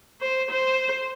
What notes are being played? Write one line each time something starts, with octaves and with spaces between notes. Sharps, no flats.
C5
C5